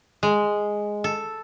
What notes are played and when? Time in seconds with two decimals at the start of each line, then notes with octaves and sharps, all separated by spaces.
0.23 G#3
1.04 A4